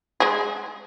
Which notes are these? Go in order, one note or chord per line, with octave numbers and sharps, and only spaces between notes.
G#3 G#4